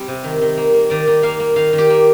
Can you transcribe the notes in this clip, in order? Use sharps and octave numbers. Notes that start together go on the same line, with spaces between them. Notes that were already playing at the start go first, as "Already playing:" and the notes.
Already playing: G3 C4
C3
D#3
D#3
A#3
A#3
D#3 D5
D#3
A#3 F5
A#3
D#3 F5
D#3
G4
A#3